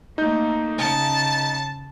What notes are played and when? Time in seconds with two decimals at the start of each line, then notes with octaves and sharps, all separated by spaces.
0.18 A3 A#3 D#4 G6
0.78 C#3 A5